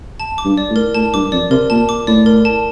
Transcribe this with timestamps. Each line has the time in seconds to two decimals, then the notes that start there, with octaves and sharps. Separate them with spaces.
0.20 A5
0.38 D6
0.45 G2
0.58 D5
0.70 A2
0.76 A#4
0.95 A2 A5
1.14 G2 D6
1.32 F2 D5
1.50 C3 A#4
1.70 A#2 A5
1.89 D6
2.07 A2 D5
2.26 A#4
2.45 A5